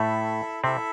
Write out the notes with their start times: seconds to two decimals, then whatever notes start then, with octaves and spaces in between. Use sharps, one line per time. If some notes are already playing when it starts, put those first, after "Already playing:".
Already playing: A2 A3 E4 A4 E5
0.64 C3 C4 E4 A4 E5